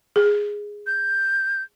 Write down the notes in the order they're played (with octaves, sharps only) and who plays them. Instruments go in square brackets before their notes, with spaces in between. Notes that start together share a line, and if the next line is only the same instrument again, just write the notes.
[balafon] G#4
[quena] G6